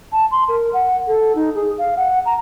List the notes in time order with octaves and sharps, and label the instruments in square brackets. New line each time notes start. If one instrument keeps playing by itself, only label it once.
[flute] A5
C6
A#4
F#5
A4
D#4
G#4
F5
F#5
A#5